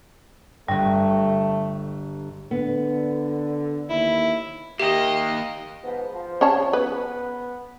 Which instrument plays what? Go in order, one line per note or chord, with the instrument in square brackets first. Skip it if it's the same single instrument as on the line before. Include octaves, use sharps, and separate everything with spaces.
[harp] G1 G2 [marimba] G3 [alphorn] A3
[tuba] D3 [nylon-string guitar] B3
[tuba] D#2 [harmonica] E4
[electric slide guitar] D#3 A#3 [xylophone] G4 [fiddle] D#5 [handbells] E5 G5
[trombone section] G#2 F3 B3
F3
[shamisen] C#4 C#5 A5
[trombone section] B3 [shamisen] B4